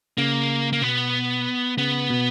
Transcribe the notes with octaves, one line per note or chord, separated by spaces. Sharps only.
C#3 A#3
A#3
B2 B3
C#3 B3
B2